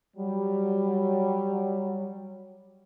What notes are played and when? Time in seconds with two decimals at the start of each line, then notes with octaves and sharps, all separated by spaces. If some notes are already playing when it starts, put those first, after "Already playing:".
0.17 F#3 G3